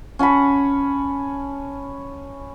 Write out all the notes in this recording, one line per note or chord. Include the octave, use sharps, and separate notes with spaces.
C#4 F#5 A5 B5